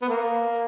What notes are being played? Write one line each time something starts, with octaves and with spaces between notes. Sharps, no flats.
B3
A#3